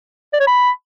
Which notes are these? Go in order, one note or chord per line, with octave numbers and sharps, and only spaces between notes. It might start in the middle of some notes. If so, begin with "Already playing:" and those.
D5
C#5
B5